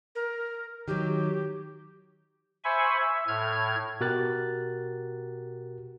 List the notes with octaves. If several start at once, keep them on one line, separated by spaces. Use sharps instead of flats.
A#4
D#3 F#3 G4
C5 E5 G#5 B5 C#6
E5
A2 F6 G#6
B2 F#4 G4 A#4 F#6 A6